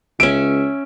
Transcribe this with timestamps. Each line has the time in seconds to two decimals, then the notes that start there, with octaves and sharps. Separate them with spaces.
0.20 C#2 C#4 E5 D7